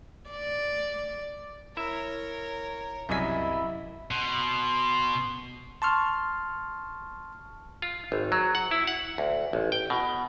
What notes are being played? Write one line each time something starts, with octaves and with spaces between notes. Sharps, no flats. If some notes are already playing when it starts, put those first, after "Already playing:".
D5
E4 A#4 C#5 E5
C2 F#2 E4 D#5 G#5 B6
B2 C6
A5 C6 C#6 F6
F4
G#1
F#3
F#5
E4
F#5
D2
A1
G5
B2